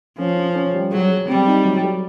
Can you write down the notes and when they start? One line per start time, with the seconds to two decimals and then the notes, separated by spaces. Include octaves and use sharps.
0.18 F3 C#4
0.36 C#4
0.55 C#4
0.74 G3
0.91 F#3 G#4
1.09 G#4
1.28 G3 C4
1.46 D#4
1.65 F#3
1.84 G4